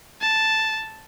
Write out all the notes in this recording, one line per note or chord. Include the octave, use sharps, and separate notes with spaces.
A5